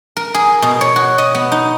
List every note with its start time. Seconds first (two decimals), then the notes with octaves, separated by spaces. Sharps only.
0.17 A#4
0.34 G#4
0.62 B2
0.81 C#5
0.96 F#4
1.18 D#5
1.35 B3
1.52 D#4